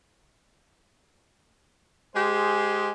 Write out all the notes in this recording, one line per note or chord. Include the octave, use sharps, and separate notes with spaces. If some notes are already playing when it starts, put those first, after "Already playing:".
G#3 G4 G#4 C5